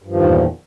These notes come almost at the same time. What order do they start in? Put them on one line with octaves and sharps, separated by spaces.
G2 F3 D#3 E2 A#2